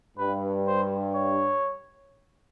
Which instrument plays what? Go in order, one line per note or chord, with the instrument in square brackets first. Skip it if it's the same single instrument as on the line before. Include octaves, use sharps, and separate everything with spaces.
[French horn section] G2 [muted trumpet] B4
[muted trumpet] C5
C#5